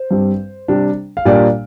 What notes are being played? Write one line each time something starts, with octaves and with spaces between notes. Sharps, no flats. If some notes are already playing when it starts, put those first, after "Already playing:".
Already playing: C5
G2 G3 C4
C3 G3 D4
F5
A#2 G3 A#3 D4 D5